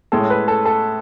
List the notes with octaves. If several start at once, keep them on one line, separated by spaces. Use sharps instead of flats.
A2 G#3 C#4 A4
B4
A4
A4